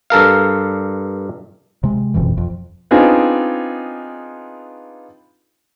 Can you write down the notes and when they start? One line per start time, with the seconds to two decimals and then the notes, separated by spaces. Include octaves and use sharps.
0.10 G2 A4 A#4 F5
1.83 C3 G#3
2.14 F#1 F2 B2 E3
2.37 F2
2.91 B3 C4 D4 D#4 F4 G#4